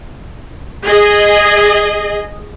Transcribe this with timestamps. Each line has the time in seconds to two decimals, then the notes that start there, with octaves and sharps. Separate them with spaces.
0.84 G#4 D#5